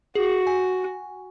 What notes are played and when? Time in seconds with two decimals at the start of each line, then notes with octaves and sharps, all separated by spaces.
0.15 F#4 G#4
0.47 G#5